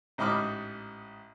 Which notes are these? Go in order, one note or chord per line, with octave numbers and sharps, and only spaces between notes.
A1 G#2 D#5 B5 D6 F6